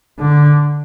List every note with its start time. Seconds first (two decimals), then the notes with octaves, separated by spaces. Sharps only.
0.19 D3